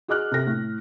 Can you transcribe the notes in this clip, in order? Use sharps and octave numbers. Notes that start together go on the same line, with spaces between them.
F#4 G#4 D#5 D6 F6 F#6
C3 A4 A#6
A2